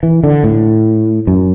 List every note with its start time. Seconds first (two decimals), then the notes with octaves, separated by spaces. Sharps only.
0.03 E3
0.24 D3
0.44 A2
1.27 F#2